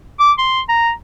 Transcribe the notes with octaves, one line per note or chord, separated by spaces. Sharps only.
D6
C6
A#5